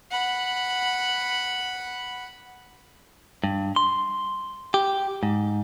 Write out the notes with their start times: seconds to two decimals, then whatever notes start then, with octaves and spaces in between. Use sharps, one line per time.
0.11 F#5 B5
3.44 G2
3.76 C6
4.74 G4
5.23 G#2